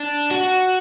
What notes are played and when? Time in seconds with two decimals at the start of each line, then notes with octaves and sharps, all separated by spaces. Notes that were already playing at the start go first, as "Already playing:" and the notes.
Already playing: D4
0.31 F#4